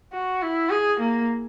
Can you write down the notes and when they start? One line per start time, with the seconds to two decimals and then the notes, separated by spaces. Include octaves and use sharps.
0.13 F#4
0.42 E4
0.70 G#4
1.00 A#3